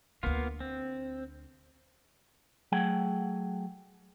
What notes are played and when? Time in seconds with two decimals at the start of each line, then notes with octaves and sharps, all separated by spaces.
0.23 D2 D3 A#3 B3 F4
0.60 C4
2.72 F#3 A3 G#4 F#5 G5